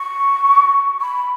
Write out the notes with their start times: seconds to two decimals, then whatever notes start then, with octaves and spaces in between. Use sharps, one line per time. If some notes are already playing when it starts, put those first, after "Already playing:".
Already playing: C#6
1.01 B5